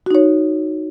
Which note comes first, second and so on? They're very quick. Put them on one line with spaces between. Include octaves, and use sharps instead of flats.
F#4 D#4 C#5